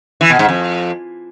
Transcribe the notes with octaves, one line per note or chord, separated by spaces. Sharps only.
E3
B2
G#2
F2